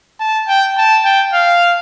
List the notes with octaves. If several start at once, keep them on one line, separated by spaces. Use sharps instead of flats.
A5
G5
A5
G5
F5